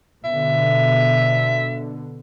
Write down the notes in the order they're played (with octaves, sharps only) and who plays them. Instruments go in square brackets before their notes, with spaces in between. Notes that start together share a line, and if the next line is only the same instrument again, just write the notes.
[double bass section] B2 D3 [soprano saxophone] E5